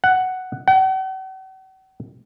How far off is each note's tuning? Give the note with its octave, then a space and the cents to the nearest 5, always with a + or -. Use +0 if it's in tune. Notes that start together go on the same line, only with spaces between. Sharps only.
F#5 +5
F#5 +45